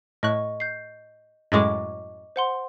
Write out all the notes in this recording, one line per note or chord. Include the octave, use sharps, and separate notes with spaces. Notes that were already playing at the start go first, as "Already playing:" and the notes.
A2 D#5 C#6 F#6
G6 C7
F#2 A2 G#3 D#5 C#6 D6
C5 F#5 C6